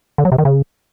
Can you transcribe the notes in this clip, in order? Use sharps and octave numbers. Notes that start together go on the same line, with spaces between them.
D3
F#3
C3
D#3
C#3